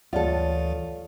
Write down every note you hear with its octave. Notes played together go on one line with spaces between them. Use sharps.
D2 E3 F4 A4 C#5 D5 F#5